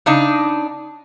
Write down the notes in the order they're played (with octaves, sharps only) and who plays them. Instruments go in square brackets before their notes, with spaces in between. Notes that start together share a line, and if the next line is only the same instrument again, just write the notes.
[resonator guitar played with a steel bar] C#3 D4 D#4